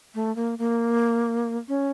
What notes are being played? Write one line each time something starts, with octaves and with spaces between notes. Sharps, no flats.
A3
A#3
A#3
C#4